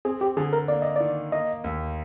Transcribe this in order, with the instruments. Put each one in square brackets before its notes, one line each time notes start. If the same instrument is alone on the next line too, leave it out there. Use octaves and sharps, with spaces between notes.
[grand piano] C4 [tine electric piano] G#4
[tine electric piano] G4
[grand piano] D3 [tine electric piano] G#4
[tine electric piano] A#4
[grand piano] A#3 [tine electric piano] D5
[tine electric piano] D#5
[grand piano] D#3 [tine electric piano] D5
[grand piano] A#3 [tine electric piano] D#5
[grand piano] D#2